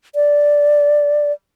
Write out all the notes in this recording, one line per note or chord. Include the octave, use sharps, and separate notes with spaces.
D5